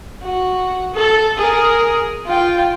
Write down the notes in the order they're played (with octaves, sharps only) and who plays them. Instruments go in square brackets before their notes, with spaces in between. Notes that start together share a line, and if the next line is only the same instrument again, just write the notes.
[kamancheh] F#4
A4
G#4 A#4
F4 G5